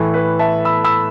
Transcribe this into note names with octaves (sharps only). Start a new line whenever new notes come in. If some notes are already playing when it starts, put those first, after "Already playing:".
Already playing: A2 E3 A3 A4
B4
E5 A5
B5 E6
B5 E6